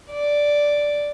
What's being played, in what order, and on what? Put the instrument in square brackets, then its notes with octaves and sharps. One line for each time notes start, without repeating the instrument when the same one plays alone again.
[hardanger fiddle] D5